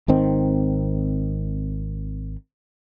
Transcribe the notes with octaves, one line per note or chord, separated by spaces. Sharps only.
G#1 D#3 C4